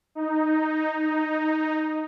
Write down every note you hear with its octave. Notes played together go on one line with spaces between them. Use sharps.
D#4
D#4